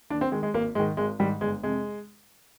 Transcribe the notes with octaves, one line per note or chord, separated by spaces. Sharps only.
D#2 D4
C4
D#3 G#3
G#3
G#1 A#3
G#2 D#3 G#3
G#1 G#3
G#2 D#3 G3
G1 G#3
F2 C3 G#3